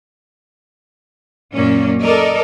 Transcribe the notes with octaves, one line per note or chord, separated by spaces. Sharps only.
F#2 A#2 A#3 C#4 D5
A4 A#4 D5 D#5